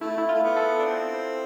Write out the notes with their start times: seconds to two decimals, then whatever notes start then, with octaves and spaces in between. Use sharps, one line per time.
0.01 A3 E4
0.18 E4
0.29 A3 F4
0.43 B3
0.56 A4
0.79 D4
0.85 C4